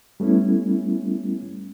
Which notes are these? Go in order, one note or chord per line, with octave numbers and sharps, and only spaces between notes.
G3 A3 B3 C#4 E4